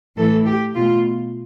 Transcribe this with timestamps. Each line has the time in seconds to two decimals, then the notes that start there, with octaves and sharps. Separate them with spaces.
0.16 A2 E3 A3 A4
0.46 G4
0.75 B2 A3 F4